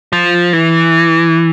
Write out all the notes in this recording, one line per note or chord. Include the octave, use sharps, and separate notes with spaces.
F3
E3